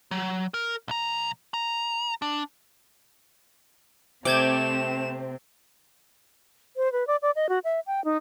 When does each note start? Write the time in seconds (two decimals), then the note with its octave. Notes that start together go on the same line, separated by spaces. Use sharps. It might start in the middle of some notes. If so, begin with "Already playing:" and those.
0.11 F#3
0.54 A#4
0.88 B1 A#5
1.54 A#5
2.22 D4
4.25 C3 A3 C4 D5 D6 G6 G#6 E7
6.77 C5
6.93 B4
7.07 D5
7.22 D5
7.36 D#5
7.49 F#4
7.64 E5
7.87 G5
8.05 D#4